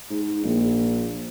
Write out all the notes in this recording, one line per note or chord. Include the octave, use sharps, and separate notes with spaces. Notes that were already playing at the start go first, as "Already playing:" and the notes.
G#2
A#1